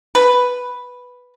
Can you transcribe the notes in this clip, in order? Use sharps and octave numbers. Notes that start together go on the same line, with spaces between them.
B4